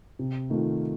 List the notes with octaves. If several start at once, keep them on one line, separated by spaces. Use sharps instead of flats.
C3
D#3 A3 C4 F4